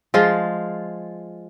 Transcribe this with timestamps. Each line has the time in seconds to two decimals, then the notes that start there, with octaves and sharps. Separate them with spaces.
0.14 F3 G#3 F4